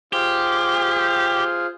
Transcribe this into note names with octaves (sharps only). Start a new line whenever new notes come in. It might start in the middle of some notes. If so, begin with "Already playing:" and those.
F4 G4 G#4 C5